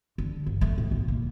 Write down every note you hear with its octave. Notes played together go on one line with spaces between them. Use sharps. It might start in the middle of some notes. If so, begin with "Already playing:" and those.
D3
G1
A3
A2
B1
A#3